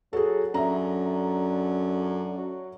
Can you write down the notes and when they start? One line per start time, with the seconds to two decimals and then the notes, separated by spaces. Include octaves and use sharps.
0.13 F#3 G#4 A4
0.54 F#2 D3 E5 A#5
2.38 F#3